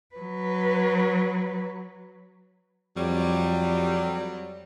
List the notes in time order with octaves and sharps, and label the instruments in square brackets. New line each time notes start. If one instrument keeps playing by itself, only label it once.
[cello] F#3 B4
[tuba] F2 [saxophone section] F#3 G3